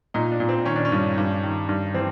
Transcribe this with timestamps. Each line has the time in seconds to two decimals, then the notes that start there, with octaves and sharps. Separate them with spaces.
0.14 A#2 D#4
0.31 D4
0.40 A#2
0.49 C4
0.66 D#3 C#4
0.76 D4
0.85 C#4
0.92 G2
1.18 G2
1.43 D#3
1.69 G2
1.94 E3 C4